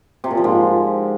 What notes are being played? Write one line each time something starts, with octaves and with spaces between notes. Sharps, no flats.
C3
A#2
F3
G#2